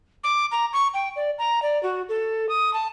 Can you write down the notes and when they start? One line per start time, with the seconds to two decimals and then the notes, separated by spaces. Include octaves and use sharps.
0.24 D6
0.51 A#5
0.73 C#6
0.94 G5
1.16 D5
1.38 A#5
1.62 D5
1.83 F#4
2.09 A4
2.49 D#6
2.73 A5